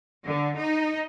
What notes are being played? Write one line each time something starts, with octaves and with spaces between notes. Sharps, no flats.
D3
D#4